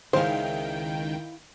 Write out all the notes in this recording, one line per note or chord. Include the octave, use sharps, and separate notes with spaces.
C#2 D#3 G#3 E4 C5 F5 G5